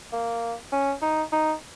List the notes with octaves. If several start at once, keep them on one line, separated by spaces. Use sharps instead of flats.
A#3
C#4
D#4
D#4